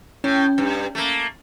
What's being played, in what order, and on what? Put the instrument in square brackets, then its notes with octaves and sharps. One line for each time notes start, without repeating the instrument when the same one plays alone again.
[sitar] A2 [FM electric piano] C#4
[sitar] G2
A3 A#3